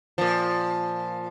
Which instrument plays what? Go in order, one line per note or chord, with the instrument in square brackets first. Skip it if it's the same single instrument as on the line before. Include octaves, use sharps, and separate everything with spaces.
[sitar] A#2 F3